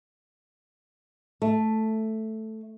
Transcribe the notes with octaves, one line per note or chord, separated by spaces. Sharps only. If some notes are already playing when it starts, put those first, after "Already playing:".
A3